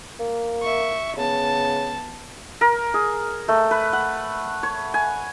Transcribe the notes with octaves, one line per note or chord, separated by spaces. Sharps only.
A#3
E5 C#6
C#3 B3 A5
A#4
G#4
A3
B4
F#5
C#5
G#5